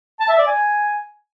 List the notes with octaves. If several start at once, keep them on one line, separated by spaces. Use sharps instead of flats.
A5
E5
D5
G#5